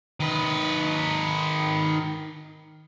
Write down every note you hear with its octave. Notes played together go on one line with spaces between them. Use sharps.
D#3 B4